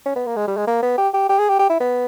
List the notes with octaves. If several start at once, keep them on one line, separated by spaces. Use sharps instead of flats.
C#4
B3
A#3
G#3
G3
G#3
A#3
B3
G4
G4
G4
G#4
G4
G4
E4
B3